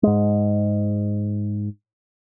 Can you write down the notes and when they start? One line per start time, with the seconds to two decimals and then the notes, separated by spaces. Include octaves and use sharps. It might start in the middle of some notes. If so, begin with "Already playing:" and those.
0.03 G#2 G#3